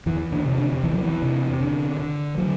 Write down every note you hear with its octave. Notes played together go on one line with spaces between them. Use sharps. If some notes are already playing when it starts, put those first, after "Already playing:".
E2 E3
D3
C3
D3
E2 E3
F#3
E3
C3
D3
D3
D3 F#3